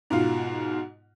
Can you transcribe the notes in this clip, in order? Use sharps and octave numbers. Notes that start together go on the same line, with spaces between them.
G#2 B2 F4